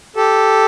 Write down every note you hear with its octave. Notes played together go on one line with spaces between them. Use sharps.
G4 A4